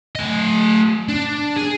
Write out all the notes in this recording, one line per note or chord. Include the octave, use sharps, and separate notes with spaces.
A3 D#5
D4
G#4